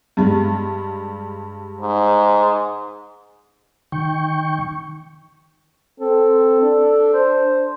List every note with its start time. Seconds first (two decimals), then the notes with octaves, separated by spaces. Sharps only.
0.17 G2 G3 G#3
1.81 G#2
3.92 D#3 G5 C#6
6.00 C4 A4
6.62 D4
7.13 C5